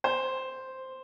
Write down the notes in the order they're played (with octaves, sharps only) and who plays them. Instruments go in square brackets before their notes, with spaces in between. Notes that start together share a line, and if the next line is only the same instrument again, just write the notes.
[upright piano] C5